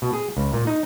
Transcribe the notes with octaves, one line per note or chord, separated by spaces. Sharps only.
B2
G#4
C#2
A#2
D#4